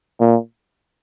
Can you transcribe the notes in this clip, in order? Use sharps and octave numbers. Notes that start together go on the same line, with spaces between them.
A#2